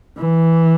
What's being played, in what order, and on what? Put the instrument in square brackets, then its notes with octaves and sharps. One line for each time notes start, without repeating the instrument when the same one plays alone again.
[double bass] E3